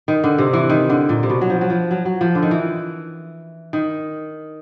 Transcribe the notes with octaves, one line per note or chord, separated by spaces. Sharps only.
D#3
D3
C3
E3
D#3
D3
A#2
C3
B2
F#3
F3
F#3
F3
F#3
F#3
F3
D3
D#3
E3
D#3